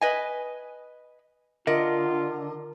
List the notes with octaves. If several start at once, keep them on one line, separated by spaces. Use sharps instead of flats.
B4 D#5 G#5
D3 F4 A#4 D#5